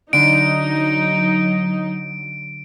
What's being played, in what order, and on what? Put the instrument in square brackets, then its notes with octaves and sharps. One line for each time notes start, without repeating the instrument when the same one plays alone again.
[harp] D3 D4 [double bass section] F#3 [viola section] D#4 [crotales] D7